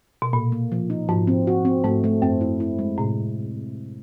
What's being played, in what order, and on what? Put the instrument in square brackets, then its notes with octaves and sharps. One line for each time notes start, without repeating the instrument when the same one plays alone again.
[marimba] B2
[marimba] A#2 [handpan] A#3
[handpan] A#3
F3
D#4
[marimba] G#2 [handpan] F3
[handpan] C4
F#4
C4
[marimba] G#2 [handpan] A3
[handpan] A3
[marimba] F#2 [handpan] C4
[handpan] E4
E4
G#3
[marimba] A2 [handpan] C3